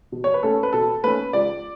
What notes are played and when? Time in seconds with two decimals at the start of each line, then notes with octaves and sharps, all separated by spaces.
0.12 B2
0.24 C#5
0.34 B4
0.43 A3 C#4 A4
0.63 B4
0.73 B2 A4
1.03 A3 C#4 B4
1.33 C#2 D5